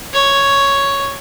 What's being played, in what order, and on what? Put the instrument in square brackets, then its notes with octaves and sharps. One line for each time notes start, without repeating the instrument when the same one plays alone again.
[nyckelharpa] C#5